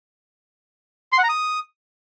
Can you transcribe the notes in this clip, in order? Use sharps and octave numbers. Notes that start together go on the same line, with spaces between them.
C6
F#5
A#5
D#6